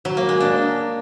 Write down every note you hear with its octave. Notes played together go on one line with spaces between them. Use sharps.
F#3
A#3
G#3
D4